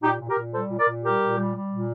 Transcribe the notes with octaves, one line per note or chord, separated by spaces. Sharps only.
A#2 D#4 G4
A#2
G4 A#4
A#2
G3 A4 C5
A#2
A#4 D5
A#2
G3 G4 A#4
A#2
G3
G3
A#2